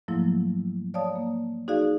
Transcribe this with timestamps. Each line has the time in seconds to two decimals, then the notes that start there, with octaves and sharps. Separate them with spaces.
0.08 G#2 F3 F#3 A3 A#3 E4
0.94 C#5 D5 F5 A5 D#6
1.16 A#3
1.68 D#4 F#4 G#4 D5 F5